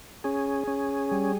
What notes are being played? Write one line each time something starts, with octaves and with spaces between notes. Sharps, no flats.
C#4 G#4
C#4
G3